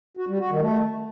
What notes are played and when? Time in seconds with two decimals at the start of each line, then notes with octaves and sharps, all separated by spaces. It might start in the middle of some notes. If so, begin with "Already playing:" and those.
0.17 F#4
0.28 G3
0.39 F#4
0.50 D#3
0.61 A3